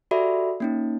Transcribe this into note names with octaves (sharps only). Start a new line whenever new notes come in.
F#4 G4 A4 D5 E5 B5
A#3 C#4 D#4